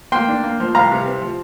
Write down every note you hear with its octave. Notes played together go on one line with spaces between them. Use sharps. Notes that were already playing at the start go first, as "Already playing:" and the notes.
A#3 G5 C6
D4
A#3
F3
C2 F5 A#5
C3
C4
F3